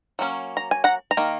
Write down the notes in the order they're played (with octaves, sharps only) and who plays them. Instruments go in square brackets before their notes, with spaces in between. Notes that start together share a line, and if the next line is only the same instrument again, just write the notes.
[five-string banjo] F#3 A#3 C#4
A#5
G#5
F#5 A#5
A#5
D#3 A#3